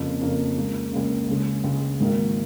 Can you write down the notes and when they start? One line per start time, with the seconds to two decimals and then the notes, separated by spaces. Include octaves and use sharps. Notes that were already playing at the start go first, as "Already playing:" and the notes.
Already playing: F2 C#3 A#3
0.21 F2 C#3 A#3
0.57 C#2 C#3 A#3
0.93 C#2 C#3 A#3
1.28 C#2 C#3 G#3
1.64 C#2 C#3 G#3
2.00 G#1 G#2 D#3 A#3